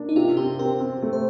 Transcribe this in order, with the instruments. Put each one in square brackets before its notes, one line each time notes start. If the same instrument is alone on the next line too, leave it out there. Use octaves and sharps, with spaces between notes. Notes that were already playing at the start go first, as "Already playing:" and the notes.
Already playing: [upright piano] A#3 D4
[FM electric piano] D#4
[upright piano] C3 [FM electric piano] F4
[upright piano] C4 [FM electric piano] G4
[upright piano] C4 [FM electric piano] A#4
[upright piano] C4
A3
[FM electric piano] C5